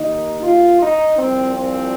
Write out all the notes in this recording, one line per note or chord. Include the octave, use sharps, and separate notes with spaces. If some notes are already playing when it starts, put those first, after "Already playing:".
Already playing: D#2 D#3 D#4
F4
D#4
C2 A#2 F3 C4
C4